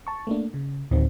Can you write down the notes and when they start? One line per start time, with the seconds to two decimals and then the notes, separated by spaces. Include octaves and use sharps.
0.07 A5 C#6
0.27 A3 A#3 D4
0.54 C#3
0.91 D1 D#3 C4